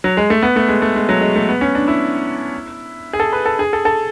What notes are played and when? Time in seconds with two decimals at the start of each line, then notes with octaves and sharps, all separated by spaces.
0.04 F#3
0.17 G#3
0.30 A3
0.42 B3
0.56 A3
0.68 G#3
0.82 A3
0.96 G#3
1.09 F#3
1.21 G#3
1.35 A3
1.48 B3
1.61 C#4
1.75 D4
1.88 E4
3.13 G#4
3.20 A4
3.33 B4
3.46 A4
3.59 G#4
3.73 A4
3.85 A4